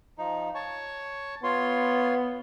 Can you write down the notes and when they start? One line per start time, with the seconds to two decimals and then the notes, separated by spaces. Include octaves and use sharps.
0.18 F3 D#4
0.55 C#5 A5 C#6
1.43 B3 F4 C#5 C6